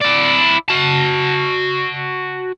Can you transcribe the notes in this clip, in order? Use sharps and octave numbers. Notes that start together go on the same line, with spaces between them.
E4 D5
F#4 A5